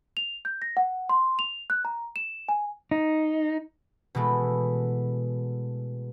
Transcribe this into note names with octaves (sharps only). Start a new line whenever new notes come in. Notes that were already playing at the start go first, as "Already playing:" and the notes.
F7
G6
A#6
F#5
C6
F7
F#6
A#5
E7
G#5
D#4
B2 E3 G#3 A3